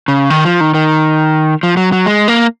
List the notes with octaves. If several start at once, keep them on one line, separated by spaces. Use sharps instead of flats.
C#3
D#3
F3
D#3
D#3
F3
F#3
F#3
G#3
A#3